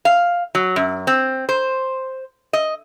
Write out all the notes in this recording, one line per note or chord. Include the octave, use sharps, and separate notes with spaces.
F5
F#3
F#2
C4
C5
D#5